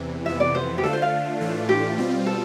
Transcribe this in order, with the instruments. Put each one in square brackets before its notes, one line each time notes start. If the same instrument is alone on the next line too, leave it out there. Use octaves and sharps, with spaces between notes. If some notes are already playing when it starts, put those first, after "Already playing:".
Already playing: [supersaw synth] E2 C3 E3
[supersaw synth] F2 C3 E3 B3 [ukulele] E5
[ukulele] D5
C5
G4
[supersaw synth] D3 A3 D4 F4 [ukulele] A4
[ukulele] C5
F5
[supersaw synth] A2 E3 A3 D4 F4
[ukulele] G4
[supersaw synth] B2 G3 C4 F4
[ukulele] A4